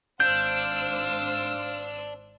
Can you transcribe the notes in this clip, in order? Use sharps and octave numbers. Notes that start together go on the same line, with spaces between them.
G#1 D4 C5 F5 E6 G6